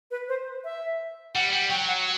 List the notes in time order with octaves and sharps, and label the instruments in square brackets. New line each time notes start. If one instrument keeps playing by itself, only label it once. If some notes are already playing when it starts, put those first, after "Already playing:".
[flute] B4
C5
E5
[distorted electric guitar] G3 [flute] F#5
[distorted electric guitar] G3
[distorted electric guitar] F#3 [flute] G5
[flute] F#5